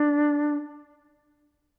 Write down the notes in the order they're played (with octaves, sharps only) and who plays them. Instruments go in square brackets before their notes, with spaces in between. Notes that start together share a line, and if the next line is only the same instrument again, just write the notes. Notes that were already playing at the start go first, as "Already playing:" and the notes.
Already playing: [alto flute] D4